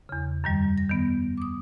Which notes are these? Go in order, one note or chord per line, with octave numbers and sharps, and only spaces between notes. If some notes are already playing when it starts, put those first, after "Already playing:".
E2 C#3
F#2 D#3 G3
A#6
D#3 B3
D6 D#6